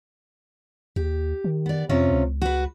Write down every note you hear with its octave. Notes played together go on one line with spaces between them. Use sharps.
D#2 G4
D#3
B3 D5
F2 C3 C#4 F4
C#2
F#4 B4